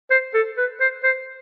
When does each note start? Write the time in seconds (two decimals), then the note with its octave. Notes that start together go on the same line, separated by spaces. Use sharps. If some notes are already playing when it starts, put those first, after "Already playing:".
0.11 C5
0.34 A4
0.58 B4
0.80 C5
1.04 C5